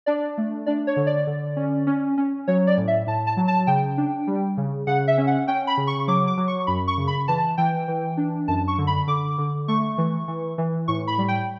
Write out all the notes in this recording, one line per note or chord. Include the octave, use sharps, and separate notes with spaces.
D4 D5
A3
D4 D5
C#5
D3
D5
D3
C#4
C#4
C#4
F#3 C#5
D5
A2
E5
A2 A5
A5
F#3
A5
C#3 G5
D4
G3
C#3
C#3 F#5
E5
C#4
F#5
C#4 G5
B5
C#3
C#6
F#3 D6
D6
F#3
C#6
F#2 B5
C#6
C#3
B5
E3 A5
E3 G5
E3
D4
F#2 A5
C#6
D3
B5
D3 D6
D3
A3 C#6
E3
E3
E3
A2 C#6
B5
G3
G5